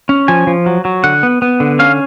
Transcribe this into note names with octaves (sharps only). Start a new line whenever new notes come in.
C#4
F3 G#5
F3
F#3
F#3
D3 F#5
B3
B3
D3
C#4 F5